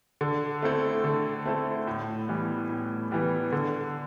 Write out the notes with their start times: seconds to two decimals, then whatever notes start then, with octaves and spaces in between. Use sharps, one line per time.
0.21 D3
0.62 A3 C4 E4 A4
1.04 D3
1.45 A3 C4 E4 A4
1.87 A2
2.28 E3 G3 B3
2.69 A2
3.11 E3 G3 B3
3.52 D3